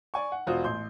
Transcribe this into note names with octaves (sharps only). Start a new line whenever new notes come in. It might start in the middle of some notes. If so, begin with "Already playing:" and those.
D5 G#5 C#6
F#5
E1 F4 F#4 C5 D#6
A1 C6 G6